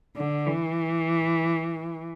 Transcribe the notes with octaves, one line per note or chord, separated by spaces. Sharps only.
D3
E3